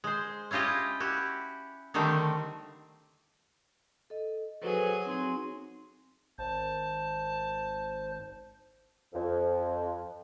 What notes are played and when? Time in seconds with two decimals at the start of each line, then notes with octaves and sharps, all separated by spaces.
0.04 G#3 C5
0.51 C#4 E4 F4 G4 D#5
1.00 E4 F#4 G4
1.94 D3 D#3 G3 A3 C4
4.10 A4 D#5
4.62 F#3 G#4 A4 B4 C5
5.06 C4 D#4 C6
6.38 G#1 C5 A5
9.14 F2